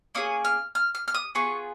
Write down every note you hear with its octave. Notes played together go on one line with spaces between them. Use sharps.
A#3 C#4 G#4 D#6
F6
F6
F6
F6
D#6
B3 F4 G#4 C#6